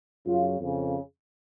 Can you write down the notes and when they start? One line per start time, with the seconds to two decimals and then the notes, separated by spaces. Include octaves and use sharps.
0.25 F#2 C#3 F4
0.59 F2 C#3